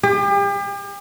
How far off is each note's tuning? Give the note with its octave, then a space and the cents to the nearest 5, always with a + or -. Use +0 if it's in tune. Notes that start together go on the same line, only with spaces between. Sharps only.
G4 +40